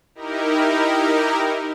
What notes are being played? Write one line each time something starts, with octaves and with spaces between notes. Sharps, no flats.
D#4 E4 G4 A#4